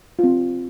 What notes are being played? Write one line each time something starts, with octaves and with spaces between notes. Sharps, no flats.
C4 F4